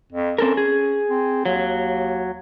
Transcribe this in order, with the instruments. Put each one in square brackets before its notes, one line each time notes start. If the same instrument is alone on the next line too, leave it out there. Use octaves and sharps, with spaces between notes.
[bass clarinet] F2
[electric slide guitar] C4 A4 A#4 [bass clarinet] C#4
[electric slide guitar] G#4
[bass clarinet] C4
[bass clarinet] D#2 [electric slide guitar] F#3